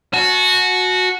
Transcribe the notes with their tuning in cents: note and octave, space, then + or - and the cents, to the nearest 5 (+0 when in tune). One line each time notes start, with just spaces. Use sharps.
F#4 -10 A5 -45